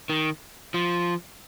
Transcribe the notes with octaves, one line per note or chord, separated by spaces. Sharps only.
D#3
F3